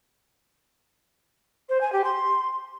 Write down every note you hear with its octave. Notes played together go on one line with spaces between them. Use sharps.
C5
G#5
G4
C6